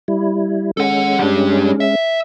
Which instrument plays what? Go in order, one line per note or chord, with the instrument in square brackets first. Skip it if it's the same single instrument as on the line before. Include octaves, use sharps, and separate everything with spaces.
[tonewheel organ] G3 E4
[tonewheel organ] G#3 C#4 [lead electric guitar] A4 F#5
[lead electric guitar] G3 D4
E5